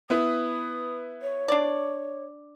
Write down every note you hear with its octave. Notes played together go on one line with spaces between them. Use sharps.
B3 E4 B4 D#6
C#5
D4 D5